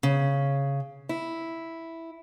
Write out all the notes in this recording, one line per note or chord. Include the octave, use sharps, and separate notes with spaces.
C#3
E4